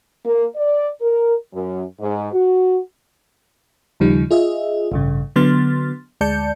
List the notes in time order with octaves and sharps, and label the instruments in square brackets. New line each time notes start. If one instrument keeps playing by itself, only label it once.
[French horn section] A#3
D5
A#4
F#2
G#2
F#4
[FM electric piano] D#2 C#3 F3 G3 D#4
F4 G#4 D#5 E5
A1 G2 C#3
D3 F#3 B3 C6 F6 A6
D2 G#3 D5 A5 G6 C#7